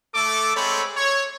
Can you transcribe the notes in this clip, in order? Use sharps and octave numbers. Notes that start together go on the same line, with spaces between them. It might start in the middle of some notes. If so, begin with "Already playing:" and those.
A3 A4 D6
G#3 C4 A4 C5 C#5 B5
C#5